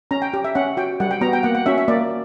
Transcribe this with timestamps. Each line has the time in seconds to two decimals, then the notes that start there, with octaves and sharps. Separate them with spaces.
0.11 C#4 A#5
0.22 G5
0.34 G4
0.44 E5
0.55 C#4 F#5
0.77 F#4 G5
1.00 G3 F#5
1.11 G5
1.21 B3 F#4 A#5
1.33 G5
1.43 A#3 F#5
1.55 F#5
1.66 C#4 F#4 E5
1.78 E5
1.88 A#3 D5